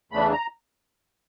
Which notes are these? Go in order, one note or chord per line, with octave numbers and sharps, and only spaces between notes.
E2 C#3 E3 A3 D4 B5
A#5